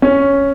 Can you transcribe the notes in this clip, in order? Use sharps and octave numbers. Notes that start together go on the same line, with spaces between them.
C#4